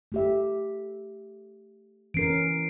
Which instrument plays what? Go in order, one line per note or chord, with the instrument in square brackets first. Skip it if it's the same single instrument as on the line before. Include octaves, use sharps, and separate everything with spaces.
[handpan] A3 G4 E5
[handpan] E3 C#4 A#4 [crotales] C7 D7